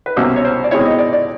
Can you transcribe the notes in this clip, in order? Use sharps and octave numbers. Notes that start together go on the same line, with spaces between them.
B4
C2 B2 F#3 A#3 C#4 C5
C#5
C5
D5
B2 G#3 C4 E4 C#5
D#5
D5
D5